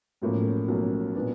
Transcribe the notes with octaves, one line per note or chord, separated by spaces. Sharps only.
B1 A2 F3 A#3 C#4
B1 A2 F3 A#3 C#4
A#2 F#3 B3 D4